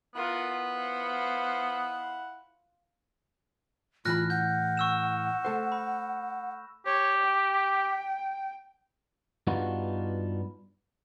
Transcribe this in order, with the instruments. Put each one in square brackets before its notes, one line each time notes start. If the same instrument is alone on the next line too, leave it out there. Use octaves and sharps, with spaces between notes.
[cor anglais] B3 [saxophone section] E4 F#5 [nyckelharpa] F4 A#4
[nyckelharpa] C5 F5
[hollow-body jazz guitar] A2 E3 B5 [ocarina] F4 [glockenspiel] F6 F#6 A#6
[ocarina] F#5 [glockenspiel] G6
[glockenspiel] C#6 E6 E7
[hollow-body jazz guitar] A3 A4 C5
[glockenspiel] B5
[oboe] G4 [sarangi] C#5
[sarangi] G5
[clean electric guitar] G2 B3 D4 D#4 F4 F#4